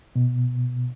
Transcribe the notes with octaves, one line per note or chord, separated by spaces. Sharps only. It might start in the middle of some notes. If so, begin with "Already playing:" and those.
B2